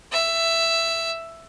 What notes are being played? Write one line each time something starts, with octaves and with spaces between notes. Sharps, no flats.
E5